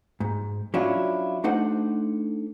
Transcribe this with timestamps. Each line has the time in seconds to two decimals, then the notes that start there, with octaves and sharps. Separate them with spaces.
0.20 G#2
0.74 F#3 C#4 D4 E4 F4
1.44 A3 D4 D#4 C5 F#5